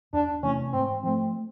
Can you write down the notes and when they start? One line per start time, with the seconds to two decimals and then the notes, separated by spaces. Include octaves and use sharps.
0.13 E2 D4
0.43 C3 E3 A3 C#4
0.73 G#2 C4
1.03 F3 A3 C4